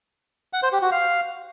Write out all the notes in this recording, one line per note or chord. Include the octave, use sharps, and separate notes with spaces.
F#5
C5
G4
F#4
F5